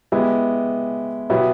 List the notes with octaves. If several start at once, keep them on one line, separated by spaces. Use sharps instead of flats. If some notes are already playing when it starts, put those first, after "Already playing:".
G#3 B3 E4 G4
B2 F#3 B3 E4 G4